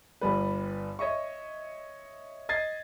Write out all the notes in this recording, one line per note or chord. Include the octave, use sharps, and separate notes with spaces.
G1 G3 B4
C#5 D#5 E5 C#6
D#5 G#6 A6 C7